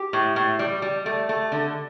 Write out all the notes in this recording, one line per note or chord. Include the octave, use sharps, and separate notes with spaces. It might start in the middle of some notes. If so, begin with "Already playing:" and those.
Already playing: G4
A2
A2
G3
G3
A3
A3
D3